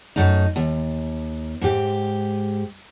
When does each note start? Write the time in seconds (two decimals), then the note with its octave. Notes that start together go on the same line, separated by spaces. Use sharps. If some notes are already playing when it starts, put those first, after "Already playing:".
0.16 F#2 A3 D#4
0.56 D#2
1.61 G#2 G4